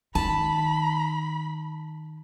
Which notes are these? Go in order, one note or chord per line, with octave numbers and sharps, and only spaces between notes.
D#3 A5 B5